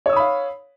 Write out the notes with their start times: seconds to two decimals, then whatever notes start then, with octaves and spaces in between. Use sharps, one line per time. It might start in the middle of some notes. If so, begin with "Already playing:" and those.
0.06 C#5
0.09 E6
0.13 D#6
0.16 B5
0.20 F5